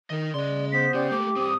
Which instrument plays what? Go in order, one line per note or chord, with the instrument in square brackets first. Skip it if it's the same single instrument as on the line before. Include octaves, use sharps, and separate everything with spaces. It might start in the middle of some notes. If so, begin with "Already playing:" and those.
[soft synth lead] D#3 [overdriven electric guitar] A#4 D#5
[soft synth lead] C#3 [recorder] D5 [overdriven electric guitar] D#5 C6
[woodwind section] B3 C5 [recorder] B6
[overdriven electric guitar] C#3 [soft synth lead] G4 [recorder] D5
[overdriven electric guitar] A3 A#3 [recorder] D6
[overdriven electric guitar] G2 C4 [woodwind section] D#6